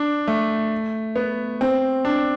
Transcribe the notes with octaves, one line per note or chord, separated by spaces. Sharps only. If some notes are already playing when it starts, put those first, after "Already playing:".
Already playing: D4
A3
B3
C4
D4